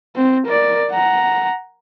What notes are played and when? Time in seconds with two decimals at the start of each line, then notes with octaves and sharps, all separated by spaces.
0.16 C4
0.46 A#4 D5
0.91 F#5 A#5